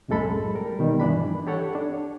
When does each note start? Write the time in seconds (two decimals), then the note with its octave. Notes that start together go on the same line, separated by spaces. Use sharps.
0.08 C2 F#2 A2 G#3 A4 B5
0.55 G3 A#4
0.79 B2 D#3 G3
1.00 G2 E3 D4 B5
1.47 G4 A4 C#5 F#5
1.75 D4